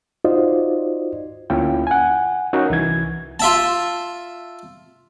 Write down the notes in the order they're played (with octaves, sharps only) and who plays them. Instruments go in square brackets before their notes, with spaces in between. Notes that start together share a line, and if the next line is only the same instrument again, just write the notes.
[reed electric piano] D#4 F4 F#4 C5 D5 D#5
D2 A#3 C#4 E4 F4 G5
F#5 G#5
C#4 D#4 F#4 A#4
C2 E3 G#6
[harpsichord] F4 E5 A5